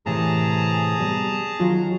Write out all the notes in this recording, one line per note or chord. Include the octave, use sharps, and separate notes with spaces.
A2 C3 E3 G#4 A5 A#5
G3 B3
D#3 F#3 F4